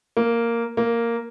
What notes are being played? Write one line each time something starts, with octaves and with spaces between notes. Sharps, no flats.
A#3
A#3